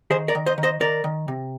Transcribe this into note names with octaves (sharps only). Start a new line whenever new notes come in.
D#3 G#4 C5
A#4 D5
D#3
C5 D#5
D#3
C5 D#5
D#3 A#4 D5
D#3
C3